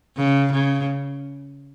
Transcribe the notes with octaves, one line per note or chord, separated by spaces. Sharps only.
C#3
C#3